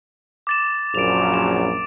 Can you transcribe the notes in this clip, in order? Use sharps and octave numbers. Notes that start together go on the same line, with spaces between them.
D6 A6 E7
A#1 F#2 D7 F7
E7